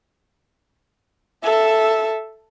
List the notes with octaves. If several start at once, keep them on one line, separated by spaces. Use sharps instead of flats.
A4 E5